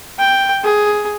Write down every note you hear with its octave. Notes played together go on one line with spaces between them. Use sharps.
G5
G#4